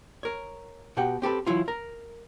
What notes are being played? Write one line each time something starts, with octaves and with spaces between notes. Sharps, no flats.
A#4 C#5
B2 G4 F#5 G5
C4 G4 A4 B4
E3 F#3 E4 F4
A#4 A#5